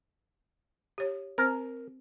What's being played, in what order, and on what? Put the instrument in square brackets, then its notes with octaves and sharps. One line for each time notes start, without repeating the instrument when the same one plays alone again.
[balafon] G4 C#5
[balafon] C4 C5 [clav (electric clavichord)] A#4